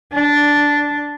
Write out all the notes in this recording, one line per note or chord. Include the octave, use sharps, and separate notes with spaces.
D4